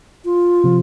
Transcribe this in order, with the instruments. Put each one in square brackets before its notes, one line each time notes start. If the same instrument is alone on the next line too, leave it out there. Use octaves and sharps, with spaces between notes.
[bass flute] F4
[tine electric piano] C3 F3